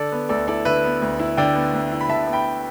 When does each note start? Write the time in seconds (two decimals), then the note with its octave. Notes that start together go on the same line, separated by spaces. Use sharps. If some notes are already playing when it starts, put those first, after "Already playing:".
Already playing: D3 A4 D5
0.12 B3
0.29 D2 A4 D5
0.48 E4 A4 D5
0.65 D3 B4 E5
0.84 B3
1.02 D2
1.19 E4
1.37 D3 D5 G5
1.55 B3
1.74 D2
1.92 E4
2.01 B5
2.09 D3 E5 A5
2.27 B3
2.33 G5 B5